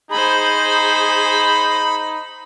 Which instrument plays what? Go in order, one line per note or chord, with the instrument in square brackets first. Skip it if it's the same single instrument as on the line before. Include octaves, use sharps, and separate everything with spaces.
[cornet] D#4 [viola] G#4 C5 [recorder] B5